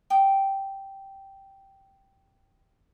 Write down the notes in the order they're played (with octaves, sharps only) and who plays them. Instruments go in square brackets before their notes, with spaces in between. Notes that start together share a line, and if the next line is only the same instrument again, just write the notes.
[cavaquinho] G5 D#6